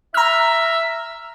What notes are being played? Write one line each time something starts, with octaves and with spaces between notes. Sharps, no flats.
E5 A#5 F6